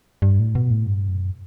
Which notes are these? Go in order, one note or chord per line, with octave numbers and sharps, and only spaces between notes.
G2
A2
B2
A2
G2
F#2